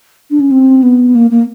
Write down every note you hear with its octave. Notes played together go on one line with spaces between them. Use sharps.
D4
C#4
C4
B3
A#3
A#3